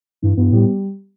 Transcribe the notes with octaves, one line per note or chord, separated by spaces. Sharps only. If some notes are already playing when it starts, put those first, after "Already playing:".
G2 E3
G2 B3
A2 G3